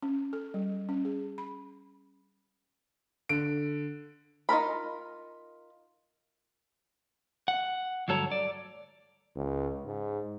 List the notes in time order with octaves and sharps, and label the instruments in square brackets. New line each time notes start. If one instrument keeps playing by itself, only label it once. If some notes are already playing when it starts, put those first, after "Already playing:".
[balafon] C#4
A4
G3
C#4
G#4
B5
[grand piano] D3 D7
[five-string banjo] D#4 F4 A#4 B5
[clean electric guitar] F#5
D2 G2 F#3 A4 C#5 A#5
D5
[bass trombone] C#2
G#2